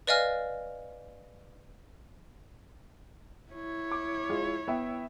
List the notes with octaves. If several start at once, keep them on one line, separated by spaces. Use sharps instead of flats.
B4 D5 D#5 F5 G#5 F6
E4 C#5
D6
G#3 F4
B3 E5 G5